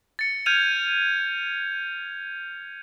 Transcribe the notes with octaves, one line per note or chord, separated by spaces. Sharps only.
A6 C#7
F6 G6 G#6 D#7 F7